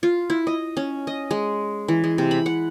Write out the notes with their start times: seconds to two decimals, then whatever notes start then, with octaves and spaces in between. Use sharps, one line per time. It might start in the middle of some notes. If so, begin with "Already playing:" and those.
0.03 F4
0.30 E4
0.47 D#5
0.77 C#4
1.07 D#5
1.31 G#3
1.88 E3
2.04 G#3
2.18 C3
2.31 B5
2.46 F#5